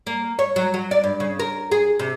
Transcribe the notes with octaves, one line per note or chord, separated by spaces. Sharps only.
A#3
C#5
F#3
F#3
D5
G2
C#3
A#4
G#4
C3